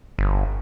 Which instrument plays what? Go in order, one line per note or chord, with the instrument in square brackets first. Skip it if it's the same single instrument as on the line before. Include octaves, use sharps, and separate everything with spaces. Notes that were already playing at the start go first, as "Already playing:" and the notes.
[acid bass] G1